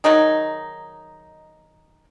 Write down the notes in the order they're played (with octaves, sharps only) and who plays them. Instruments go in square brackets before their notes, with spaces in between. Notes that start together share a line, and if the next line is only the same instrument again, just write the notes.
[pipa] D#3 F#3 D#4 G#4